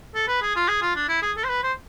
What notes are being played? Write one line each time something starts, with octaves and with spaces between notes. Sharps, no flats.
A4
B4
G#4
F4
G#4
F4
D4
E4
G#4
A4
C5
B4
C5